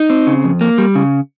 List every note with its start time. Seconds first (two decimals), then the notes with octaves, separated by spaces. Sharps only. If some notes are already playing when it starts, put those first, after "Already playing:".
Already playing: D#4
0.10 C4
0.27 C#3
0.44 F2
0.61 A#3
0.78 G3
0.95 C#3